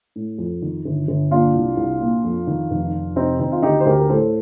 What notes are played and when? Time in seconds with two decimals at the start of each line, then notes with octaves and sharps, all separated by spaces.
0.16 A2
0.38 F2
0.62 D#3
0.85 G1
1.08 G1
1.31 A#2 D4 F4
1.54 C2
1.77 C2
2.01 A#2
2.24 F2
2.47 D#3
2.70 F1
2.94 F1
3.16 C3 C4 D#4
3.39 D#3 C4 D#4
3.52 F4
3.63 D2 D#4 G4
3.80 C5
3.86 D2 G4 A#4
3.99 A#4
4.09 A2 A4 C5